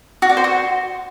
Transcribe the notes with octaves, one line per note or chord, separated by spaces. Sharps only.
F#4
D5
C5
F#4